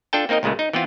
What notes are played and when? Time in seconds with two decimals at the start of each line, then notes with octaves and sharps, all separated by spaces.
0.13 D4 F4 A4 G5 A5
0.29 A#3 C4 D#4 A#4 D#5
0.43 C#2 A#2 C#3 G#3 A3
0.59 D#4
0.73 E3 B3 C4 F4